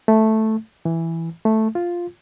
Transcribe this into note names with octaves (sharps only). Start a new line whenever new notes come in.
A3
E3
A3
F4